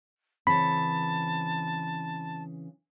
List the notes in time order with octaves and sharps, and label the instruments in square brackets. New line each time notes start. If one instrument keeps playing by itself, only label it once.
[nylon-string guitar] C#3 E3 C4 [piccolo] A5 [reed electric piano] B5